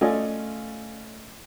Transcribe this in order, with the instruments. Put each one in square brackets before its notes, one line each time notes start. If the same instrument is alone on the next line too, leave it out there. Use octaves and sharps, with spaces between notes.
[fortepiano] A3 C#4 F4 D5 D#5 G#5